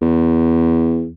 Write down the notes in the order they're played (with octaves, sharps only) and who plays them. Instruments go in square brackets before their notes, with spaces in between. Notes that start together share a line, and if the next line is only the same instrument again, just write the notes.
[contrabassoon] E2